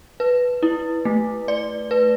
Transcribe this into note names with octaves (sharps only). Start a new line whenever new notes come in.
B4
E4
A3
D5
B4